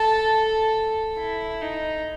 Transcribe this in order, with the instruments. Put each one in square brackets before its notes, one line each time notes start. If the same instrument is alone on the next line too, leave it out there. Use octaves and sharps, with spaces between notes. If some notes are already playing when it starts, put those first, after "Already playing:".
Already playing: [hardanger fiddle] A4 [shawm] A5
[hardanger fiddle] E4
D#4